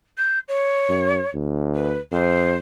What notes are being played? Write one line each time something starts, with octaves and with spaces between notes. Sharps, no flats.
G6
C#5
F#2
D2
B4
F2 C5